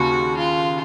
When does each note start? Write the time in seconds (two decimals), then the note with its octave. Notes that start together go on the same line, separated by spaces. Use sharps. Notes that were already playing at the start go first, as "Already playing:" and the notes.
Already playing: D#2 C#3 A#3 F#4
0.37 F4